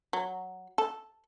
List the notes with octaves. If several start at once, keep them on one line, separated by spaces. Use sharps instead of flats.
F#3
A4